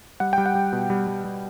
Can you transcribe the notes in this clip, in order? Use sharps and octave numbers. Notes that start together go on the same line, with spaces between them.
G3 F#5
G3 G5
F#5
G3
B2
G3
G3
G3